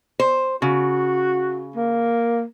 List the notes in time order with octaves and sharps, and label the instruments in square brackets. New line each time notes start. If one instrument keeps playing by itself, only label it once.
[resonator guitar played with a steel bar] C5
[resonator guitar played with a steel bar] C#3 [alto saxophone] F#4
[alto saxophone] A#3